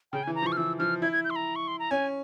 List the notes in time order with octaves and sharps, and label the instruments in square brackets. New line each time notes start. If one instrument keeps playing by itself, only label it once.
[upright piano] C#3 [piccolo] G5
[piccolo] G#5
[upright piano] E3
[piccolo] A#5
[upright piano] F3
[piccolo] C#6
F6
[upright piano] E3 [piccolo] E6
[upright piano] F3 [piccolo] F6
[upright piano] E4 [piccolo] G#6
[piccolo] G#6
G6
C6
A#5
C#6
C6
A#5
[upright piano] C#4 [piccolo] G#5